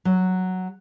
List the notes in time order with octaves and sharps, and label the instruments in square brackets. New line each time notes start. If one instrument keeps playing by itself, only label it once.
[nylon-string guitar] F#3